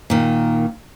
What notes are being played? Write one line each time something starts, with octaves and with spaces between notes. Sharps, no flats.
A#2 D#3